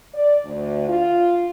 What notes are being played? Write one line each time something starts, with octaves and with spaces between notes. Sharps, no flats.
D5
D2
F4